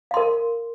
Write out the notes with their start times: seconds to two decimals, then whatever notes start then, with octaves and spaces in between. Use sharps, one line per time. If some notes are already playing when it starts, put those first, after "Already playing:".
0.11 F5
0.14 C6
0.17 A#4